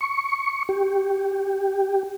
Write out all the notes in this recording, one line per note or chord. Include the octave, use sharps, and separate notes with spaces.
C#6
G4